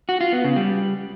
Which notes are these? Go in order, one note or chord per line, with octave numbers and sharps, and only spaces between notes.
F#4
F4
B3
C#3
G3